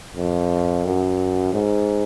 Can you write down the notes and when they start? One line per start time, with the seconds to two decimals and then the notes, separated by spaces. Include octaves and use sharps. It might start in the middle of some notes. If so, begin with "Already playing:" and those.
0.16 F2
0.85 F#2
1.53 G#2